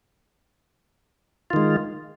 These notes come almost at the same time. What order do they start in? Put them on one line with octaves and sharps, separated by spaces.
F4 D#3 G#3